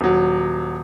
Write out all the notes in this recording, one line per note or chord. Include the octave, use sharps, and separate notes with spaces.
D#1 F#3